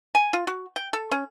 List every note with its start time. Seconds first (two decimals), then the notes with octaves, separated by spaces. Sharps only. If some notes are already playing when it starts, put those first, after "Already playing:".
0.15 G#5
0.33 F4
0.47 F#4
0.76 G5
0.93 A4
1.11 C#4